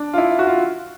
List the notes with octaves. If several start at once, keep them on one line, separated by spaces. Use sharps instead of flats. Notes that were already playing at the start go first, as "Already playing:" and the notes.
Already playing: D4
F4
E4
F#4
F4